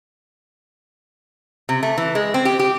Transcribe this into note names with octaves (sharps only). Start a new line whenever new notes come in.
C3
A3
E3
G#3
C4
G4
G4